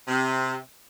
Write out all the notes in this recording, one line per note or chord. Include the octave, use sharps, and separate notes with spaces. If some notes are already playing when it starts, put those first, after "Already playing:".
C3